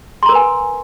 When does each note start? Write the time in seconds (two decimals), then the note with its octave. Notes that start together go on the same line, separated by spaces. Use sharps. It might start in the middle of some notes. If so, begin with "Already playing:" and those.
0.23 C6
0.26 A#5
0.29 A#4
0.32 B4
0.35 G#5